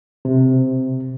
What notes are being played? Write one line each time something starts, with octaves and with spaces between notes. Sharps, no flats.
C3